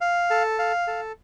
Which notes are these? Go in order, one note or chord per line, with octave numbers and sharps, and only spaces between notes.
F5
A4
F5
A4